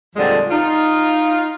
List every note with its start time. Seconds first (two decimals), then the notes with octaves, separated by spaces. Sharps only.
0.16 F2 A#2 D3 F3 G3 G#3
0.51 D#4 F4